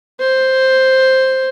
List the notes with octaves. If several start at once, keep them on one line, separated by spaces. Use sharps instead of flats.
C5